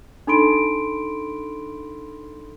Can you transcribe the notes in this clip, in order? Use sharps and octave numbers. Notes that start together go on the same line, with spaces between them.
D4 D#4 A4 B5 C6 D7